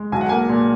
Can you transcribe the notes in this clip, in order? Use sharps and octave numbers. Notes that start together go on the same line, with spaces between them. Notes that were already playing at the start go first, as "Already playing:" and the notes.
Already playing: G#3
B1 G#5
F#5
A#3 G#5
A#2